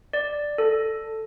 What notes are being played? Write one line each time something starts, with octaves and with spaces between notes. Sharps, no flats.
D5
A4